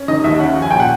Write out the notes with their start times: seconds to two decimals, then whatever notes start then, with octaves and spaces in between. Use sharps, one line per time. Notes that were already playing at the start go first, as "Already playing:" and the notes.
Already playing: C#4
0.08 D#3 D#5
0.24 D#2 E5
0.40 C#4 F#5
0.56 F3
0.62 G#5
0.71 A#2 G5
0.80 F#5